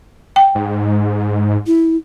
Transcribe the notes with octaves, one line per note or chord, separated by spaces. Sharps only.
G5
G#2
E4